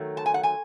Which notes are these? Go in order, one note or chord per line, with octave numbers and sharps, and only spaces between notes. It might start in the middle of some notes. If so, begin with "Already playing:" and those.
Already playing: D#3 F#3 A3
A5
G#5
F#5
G#5